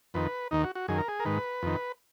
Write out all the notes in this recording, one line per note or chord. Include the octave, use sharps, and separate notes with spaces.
F2 D#3 B4
D#2 D#3 D#4
F#4
F#4
F#2 D#3 G#4
A#4
G#4
A#4
G#2 D#3 B4
F2 D#3